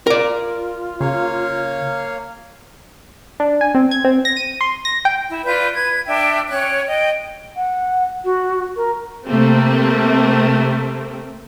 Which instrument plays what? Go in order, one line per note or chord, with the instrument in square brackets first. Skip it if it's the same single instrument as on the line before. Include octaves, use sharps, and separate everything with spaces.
[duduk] F4 [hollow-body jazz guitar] A#4 D5
[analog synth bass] C#3 [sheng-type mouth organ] A#3 C#5 F5
[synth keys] D4
G#5
C4
G#6
C4
A#6
D#7
C6
A#6
G5
[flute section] E4
F4 B4 D5 G6
B4 G#6
D4 E5 G5
C#4 C#5 G5 F#6
D#5 G5
[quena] F#5
F#4
A#4
[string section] C3 A3 A#3 C4